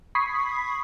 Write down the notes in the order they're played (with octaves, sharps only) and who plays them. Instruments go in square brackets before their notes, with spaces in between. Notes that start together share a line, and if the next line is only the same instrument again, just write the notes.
[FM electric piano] B5 C#6 D#6 G#6 B6 C7